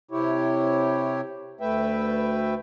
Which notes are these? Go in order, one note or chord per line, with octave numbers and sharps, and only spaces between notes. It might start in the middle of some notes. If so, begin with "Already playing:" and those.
C3 E4 G4 C#5
D2 A3 B4 E5 G5